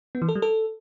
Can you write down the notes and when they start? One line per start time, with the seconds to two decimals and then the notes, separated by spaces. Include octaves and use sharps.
0.15 B3
0.22 E3
0.29 A4
0.35 G3
0.42 A4